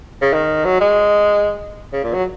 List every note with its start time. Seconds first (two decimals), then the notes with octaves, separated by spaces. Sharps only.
0.22 C#3
0.33 D#3
0.65 F#3
0.81 G#3
1.93 C#3
2.04 A#2
2.14 F#3